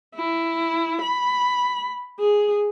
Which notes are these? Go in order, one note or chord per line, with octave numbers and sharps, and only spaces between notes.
E4
B5
G#4